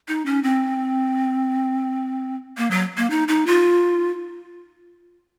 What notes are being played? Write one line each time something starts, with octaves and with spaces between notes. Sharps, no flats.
D#4
C#4
C4
A#3
F#3
A#3
D#4
D#4
F4